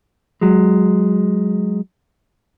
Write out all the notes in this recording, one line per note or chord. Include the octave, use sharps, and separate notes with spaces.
F#3 G#3